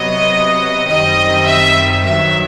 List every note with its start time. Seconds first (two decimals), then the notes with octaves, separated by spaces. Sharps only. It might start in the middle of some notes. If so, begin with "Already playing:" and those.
Already playing: C3 F#3 B3 D#5
0.86 F#2 D#3 G3 C4 D#5
1.45 E5
2.04 G2 D#3 F#3 E5